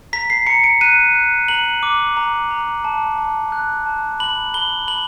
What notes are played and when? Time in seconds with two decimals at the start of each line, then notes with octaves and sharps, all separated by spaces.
0.13 A#5 B6
0.30 C7
0.47 A#5 C#7
0.64 D7
0.81 F#6 D#7
1.15 F#6
1.48 A#5 F#7
1.83 D6
2.17 A#5
2.51 A#5
2.84 A5
3.18 A5
3.52 F#6
3.86 A5
4.20 B5 F#7
4.54 B5 G7
4.88 B5 F#7